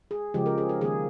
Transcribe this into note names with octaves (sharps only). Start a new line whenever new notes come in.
G#4
C#3 F3 G#3 G4
A#4
G#4
A#4
D#3 A#3 G#4